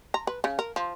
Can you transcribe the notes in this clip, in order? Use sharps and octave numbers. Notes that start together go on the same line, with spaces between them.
A#5
B4
C#3
A#4
F3